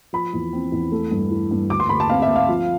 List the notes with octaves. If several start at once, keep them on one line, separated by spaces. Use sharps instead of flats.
F3 B5
E2
C4
E2
A3
G2
E3
G2
D2 D6
C6
D2 B5
A5
C4 F5
E5
C4
F5
F3